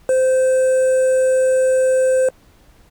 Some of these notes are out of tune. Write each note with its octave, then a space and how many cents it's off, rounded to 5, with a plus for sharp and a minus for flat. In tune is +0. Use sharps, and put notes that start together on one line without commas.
C5 -15